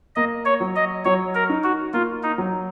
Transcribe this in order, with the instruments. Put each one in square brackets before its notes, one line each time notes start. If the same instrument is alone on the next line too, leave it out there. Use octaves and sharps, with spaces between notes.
[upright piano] A#3 [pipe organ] D#5
[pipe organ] C#5
[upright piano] F#3
[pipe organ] D#5
[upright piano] F#3 [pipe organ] C#5
[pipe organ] A#4
[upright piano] D#4
[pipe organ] F#4
[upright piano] A#3 [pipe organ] F4
[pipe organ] D#4
[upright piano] F#3